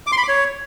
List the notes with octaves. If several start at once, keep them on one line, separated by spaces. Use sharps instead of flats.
D6
C6
B5
D6
C#5